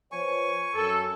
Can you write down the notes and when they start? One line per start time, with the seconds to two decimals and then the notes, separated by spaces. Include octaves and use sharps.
0.12 F3 B3 C#5 G#5 C#6
0.74 F#2 A4